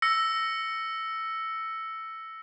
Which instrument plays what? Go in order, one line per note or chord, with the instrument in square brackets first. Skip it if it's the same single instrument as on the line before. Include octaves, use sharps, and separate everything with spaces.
[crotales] E6 A#6 C#7